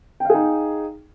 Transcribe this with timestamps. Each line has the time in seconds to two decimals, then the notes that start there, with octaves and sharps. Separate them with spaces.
0.20 G5
0.25 F5
0.30 G#4
0.34 D#4